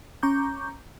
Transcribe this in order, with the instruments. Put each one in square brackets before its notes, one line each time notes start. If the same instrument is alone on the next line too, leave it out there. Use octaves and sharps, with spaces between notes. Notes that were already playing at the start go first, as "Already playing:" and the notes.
[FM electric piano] C#4 A#5 C#6 D6 G6